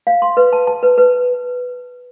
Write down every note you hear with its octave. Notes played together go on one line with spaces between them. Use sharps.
F5
C6
B4
A5
A5
B4
B4